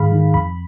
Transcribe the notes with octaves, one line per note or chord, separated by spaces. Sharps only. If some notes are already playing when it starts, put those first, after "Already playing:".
Already playing: G#2 D#3 G#4 F5 B5
D#3
F2 B5